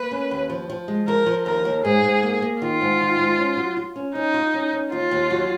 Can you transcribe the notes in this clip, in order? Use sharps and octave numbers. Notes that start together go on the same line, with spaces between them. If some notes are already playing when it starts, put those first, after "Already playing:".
Already playing: A#3 B4
C#4
D#2
F3
F3
G#3
F3 A#4
F3
D#2 A#4
D#2
G#2 G#4
G#2
A#3
A#3
D#3 F4
G#2
D#3
G#2
C#4
F#3
F4
C#4
C#4 D#4
F4
C#4
C#4
D#2 F4
D#2
F#3